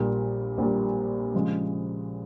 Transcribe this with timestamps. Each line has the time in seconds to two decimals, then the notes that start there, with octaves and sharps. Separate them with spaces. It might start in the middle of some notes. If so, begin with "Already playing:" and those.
Already playing: A#1 A#2 G3
0.58 A#1 A#2 G3
1.34 C#3 F3 G#3